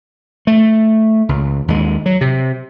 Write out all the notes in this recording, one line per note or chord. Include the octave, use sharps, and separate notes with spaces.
A3
C#2
D#2 G#3
F#3
C3